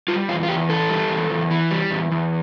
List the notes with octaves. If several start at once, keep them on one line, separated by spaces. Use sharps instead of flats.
G3 F4
E2 F4
F4
E2 G4
E3 A4
G3
E2
E2
E3
G3
E2
E2